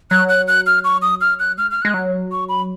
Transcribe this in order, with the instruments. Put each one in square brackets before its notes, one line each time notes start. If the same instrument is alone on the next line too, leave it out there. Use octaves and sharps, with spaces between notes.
[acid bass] F#3 [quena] F#6
[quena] F#6
F#6
F6
C#6
D#6
F6
F#6
[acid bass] G#3 [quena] F6
[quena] F6
[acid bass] G#3 [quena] F#6
[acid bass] F#3
[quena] C#6
B5